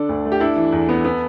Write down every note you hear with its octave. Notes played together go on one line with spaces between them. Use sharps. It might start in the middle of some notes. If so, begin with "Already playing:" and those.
Already playing: D3 D4 A4 D5
D2
A3
G4
D4 E4 A4
E3
E2
B3
B3